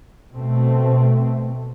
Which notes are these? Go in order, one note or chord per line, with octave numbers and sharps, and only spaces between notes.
B2 A3 C4